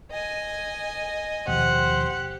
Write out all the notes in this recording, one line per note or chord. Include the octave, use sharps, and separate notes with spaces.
D#5 G#5
D#2 B2 F3 G4 C5 F#5